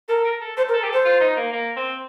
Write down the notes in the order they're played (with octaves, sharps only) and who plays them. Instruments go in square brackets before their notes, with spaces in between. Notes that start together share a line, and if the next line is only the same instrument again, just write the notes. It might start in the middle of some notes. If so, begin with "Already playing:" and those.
[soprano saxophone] A4 [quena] A#4
[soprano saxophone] A#4
A4
[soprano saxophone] A4 [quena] C5
[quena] A#4
[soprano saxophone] A4
G4
[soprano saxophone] A4 [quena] C5
[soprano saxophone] F4
D#4
A#3
A#3
C4